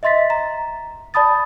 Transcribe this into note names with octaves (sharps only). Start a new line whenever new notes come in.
D#5 E5 C6 A6 B6
A#5
D5 A5 B5 D#6 A6